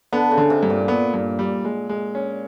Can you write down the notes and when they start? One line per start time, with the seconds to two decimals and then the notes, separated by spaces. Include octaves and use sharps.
0.12 D3 B3
0.31 C#3
0.38 D3
0.50 C3
0.63 G2
0.70 A#2
0.88 A#2 B3
1.14 G2
1.39 G3
1.65 G#3
1.89 G#3
2.15 C#4